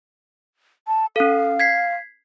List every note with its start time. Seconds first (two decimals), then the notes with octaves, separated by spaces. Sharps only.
0.88 A5
1.16 C#4 A4 F5
1.60 G#6 B6 C7